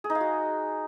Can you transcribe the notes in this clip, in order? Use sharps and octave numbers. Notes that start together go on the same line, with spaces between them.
G#4
D#4
F5
F#4